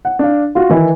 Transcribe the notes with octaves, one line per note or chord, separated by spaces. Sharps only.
F#5
D4 F5
F4 F#4
D#3 E3 E4